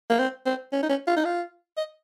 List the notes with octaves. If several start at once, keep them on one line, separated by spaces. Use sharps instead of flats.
A#3
C4
C4
C#4
D#4
C#4
F4
D#4
F4
D#5